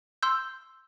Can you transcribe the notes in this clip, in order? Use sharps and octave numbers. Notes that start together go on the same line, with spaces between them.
C6 E6 G6